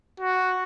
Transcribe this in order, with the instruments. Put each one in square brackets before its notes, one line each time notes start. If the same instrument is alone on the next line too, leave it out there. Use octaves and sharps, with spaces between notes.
[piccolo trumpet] F#4